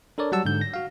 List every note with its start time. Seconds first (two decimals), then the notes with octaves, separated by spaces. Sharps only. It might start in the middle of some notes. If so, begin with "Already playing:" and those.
0.18 D4 A4 A#4 C#5 D5
0.32 F#3 G3 F#5 A5 E6
0.45 G#2 D3 G6
0.61 A#6
0.74 F#4 F5